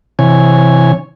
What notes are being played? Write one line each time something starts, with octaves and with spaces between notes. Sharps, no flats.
C3 E3 C#5 G#5